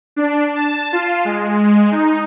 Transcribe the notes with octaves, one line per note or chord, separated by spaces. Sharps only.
D4
A5
F4
G#3
D#4